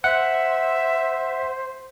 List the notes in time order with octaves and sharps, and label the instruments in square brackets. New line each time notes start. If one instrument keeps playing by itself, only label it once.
[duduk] C5 [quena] E5 [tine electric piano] F#5